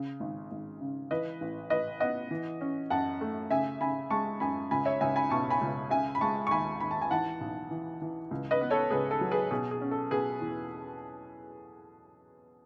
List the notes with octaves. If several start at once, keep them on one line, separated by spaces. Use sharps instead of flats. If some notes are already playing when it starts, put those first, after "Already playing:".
Already playing: C#3
G#1
G#1
C#3
E3 B4 D#5
A1
A1 B4 D#5
B3 D#5 F#5
E3
C#4
F#2 F#5 A5
A3
C#3 E5 G#5
C#3 G#5 B5
G#3 A5 C#6
F#2 G#5 B5
C#2 G#5 B5
C#5 E5
C#2 E5 G#5
G#5 B5
B2 A5 C#6
G#5 B5
C#2
C#3 E5 G#5
B5
G#3 A5 C#6
C#6
D#2 G#5 B5
D#2 B5
A5
G#5
E3 F#5 A5
B1
E3
E3
C#2
B4 D#5
B3
A4 C#5
C#2 G#4 B4
A4
F#3
G#4 B4
B2 G#4
G#4
C#4
A4
B2 G#4 B4
E2